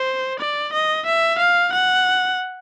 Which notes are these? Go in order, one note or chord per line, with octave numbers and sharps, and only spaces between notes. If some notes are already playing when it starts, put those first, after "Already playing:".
Already playing: C5
D5
D#5
E5
F5
F#5